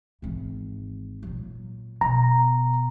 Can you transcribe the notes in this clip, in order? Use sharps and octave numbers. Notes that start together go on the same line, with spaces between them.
G#1 E3
A#2 F#3
B2 A#5